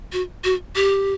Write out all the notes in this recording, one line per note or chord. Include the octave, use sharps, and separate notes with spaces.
F#4
F#4
G4